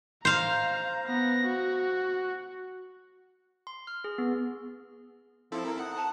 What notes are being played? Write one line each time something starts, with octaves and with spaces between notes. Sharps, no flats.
C5 F5 A#5
B3 A#6
F#4
C6
F6
G#4
B3
F3 C4 E4 A4
A#4
D#4 F#5
A5